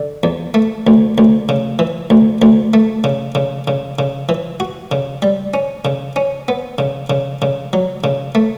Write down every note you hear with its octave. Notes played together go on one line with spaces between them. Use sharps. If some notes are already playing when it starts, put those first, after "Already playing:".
Already playing: D3
E2
A3
D2
D2
C#3
E3
D2
D2
A3
C#3
C#3
C#3
C#3
E3
F#4
C#3
G3
C#4
C#3
C#4
B3
C#3
C#3
C#3
F#3
C#3
A3